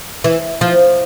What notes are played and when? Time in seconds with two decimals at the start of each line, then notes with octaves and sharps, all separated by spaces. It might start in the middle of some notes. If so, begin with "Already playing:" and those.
0.24 E3
0.61 F3